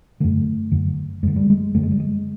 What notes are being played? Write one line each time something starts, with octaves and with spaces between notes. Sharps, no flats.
F#2 D3 A3
F#2 D3
F#2 D3 G#3
G3
G#3
F#2 D3 A3
G#3
G3
G#3